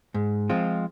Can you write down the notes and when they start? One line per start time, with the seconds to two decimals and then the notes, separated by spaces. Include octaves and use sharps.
0.14 G#2
0.50 F3 G#3 C4 F4